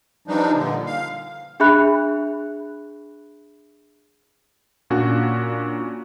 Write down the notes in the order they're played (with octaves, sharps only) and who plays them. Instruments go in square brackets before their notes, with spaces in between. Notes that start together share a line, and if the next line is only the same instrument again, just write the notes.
[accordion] E3 F3 G3 D4 D#4
A#2 D3
F5
[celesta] D4 G#4 E5 B5 F#6
[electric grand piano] A#2 C#4 D4 F#4